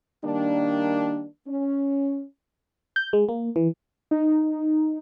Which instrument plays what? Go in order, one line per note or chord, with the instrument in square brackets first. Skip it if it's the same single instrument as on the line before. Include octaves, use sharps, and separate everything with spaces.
[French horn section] D#3 G3 A#3 D4
C#4
[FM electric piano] G6
G#3
A#3
E3
[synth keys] D#4